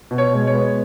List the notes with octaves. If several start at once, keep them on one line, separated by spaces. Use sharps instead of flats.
B2
C#5
G#3
C#5
B3